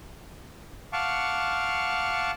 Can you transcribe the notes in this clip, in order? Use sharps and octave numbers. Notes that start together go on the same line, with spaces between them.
F5 F#5 A5 C#6 D6